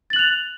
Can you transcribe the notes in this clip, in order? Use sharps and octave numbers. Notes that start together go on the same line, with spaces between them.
F#6 A6 F7 F#7